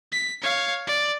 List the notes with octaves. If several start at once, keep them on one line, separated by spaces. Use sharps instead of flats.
B6
C#5 F5
D5